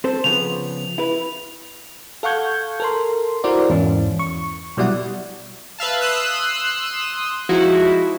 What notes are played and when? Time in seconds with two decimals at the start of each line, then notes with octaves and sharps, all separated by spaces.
0.04 C4 A4 C5
0.24 C#3 F3 B3 F7
0.98 E4 B4
2.23 A4 F5 F#5 C#6 G6 G#6
2.80 A4 A#4 C6
3.44 E4 F#4 A#4 C5 D5 E5
3.70 E2 G#2 E3 C#4
4.19 C#6
4.77 B2 F#3 G3 E4 D5 F#5
5.78 B4 E5 F5 A5
6.01 C6 D#6 E6 F#6
7.49 F3 G#3 D#4 E4 F#4